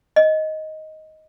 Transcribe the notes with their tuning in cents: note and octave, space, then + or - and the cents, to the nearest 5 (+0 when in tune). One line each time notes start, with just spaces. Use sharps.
D#5 +10